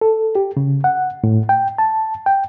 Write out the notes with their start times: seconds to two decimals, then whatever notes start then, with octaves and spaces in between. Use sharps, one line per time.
0.01 A4
0.35 G4
0.57 C#3
0.84 F#5
1.24 A2
1.49 G5
1.78 A5
2.26 G5